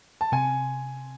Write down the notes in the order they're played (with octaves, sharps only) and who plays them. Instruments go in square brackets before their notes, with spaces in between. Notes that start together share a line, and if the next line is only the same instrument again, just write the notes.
[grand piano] A5
[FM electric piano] C3 [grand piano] G#5